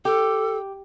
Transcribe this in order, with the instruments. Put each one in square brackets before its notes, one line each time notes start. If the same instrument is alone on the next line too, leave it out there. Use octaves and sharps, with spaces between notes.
[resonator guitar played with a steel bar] G4 [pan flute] A4